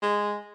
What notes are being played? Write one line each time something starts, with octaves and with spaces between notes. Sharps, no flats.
G#3